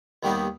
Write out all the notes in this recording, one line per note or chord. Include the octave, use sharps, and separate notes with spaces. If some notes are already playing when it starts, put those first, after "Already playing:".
D#2 D#3 G3 B3 D#4